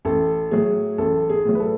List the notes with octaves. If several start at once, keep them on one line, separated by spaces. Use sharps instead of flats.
A1 A4
A2 F#3 G#4
A1 A4
G#4
A2 F#3
B4
A4